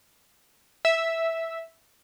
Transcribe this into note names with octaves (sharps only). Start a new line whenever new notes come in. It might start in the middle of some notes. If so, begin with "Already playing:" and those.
E5